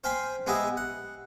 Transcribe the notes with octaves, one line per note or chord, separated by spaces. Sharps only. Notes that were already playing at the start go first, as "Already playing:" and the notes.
C5 F5 G5 G#5 B5 C6
G#3 B3 G4 G#4 D#5 E5
F#5